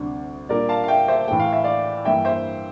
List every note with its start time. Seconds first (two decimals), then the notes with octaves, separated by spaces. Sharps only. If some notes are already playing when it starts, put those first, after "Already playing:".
Already playing: D2 C3 G3 D4
0.49 A#2 G3 D4 A#4 D5
0.69 F5 A5
0.84 F5
0.88 E5 G5
1.08 C5 E5
1.27 A2 E3 A3 G5
1.40 F5
1.53 E5
1.64 D5 F5
2.05 G2 E3 A#3 E5 G5
2.25 C5 E5